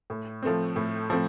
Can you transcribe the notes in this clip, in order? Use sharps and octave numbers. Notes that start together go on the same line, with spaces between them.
A2
F3 A3 C4
A2
F3 A3 C4